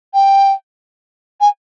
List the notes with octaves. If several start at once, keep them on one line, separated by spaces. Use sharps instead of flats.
G5
G#5